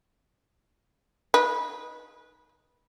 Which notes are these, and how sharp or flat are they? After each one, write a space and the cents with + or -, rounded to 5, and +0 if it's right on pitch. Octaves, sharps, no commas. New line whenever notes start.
D#4 +0 B4 -15